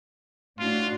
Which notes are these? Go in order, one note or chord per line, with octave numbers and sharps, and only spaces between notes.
A2 D4 F4 F#4